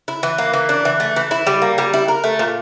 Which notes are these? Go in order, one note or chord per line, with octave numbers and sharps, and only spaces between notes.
E4
E3
A#3
E3
D4
E3
A3
E3
E4
G3
A#3
G3
E4
A#4
A3
A#2